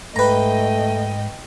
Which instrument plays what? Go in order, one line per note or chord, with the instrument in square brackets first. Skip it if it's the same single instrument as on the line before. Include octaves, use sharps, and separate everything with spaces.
[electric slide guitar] G#2 [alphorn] A3 [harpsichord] B4 A#5 [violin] D#5 G5